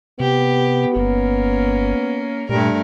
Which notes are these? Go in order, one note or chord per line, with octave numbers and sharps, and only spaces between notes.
C3 B3 G4
G1 A#3 C#4
G2 A#2 G3 A3 A#4